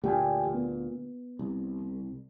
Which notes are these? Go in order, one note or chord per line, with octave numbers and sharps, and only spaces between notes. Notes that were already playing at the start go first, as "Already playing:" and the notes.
D2 A#2 D3 G4 G5 G#5
B3
C2